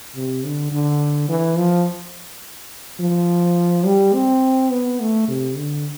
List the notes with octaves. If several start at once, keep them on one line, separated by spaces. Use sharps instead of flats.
C3
D3
D3
E3
F3
F3
G3
C4
B3
A3
C3
D3